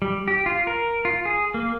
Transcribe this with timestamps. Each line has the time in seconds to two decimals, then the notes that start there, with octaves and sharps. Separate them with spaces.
0.02 G3
0.28 G4
0.46 F4
0.67 A#4
1.05 F4
1.25 G#4
1.54 A#3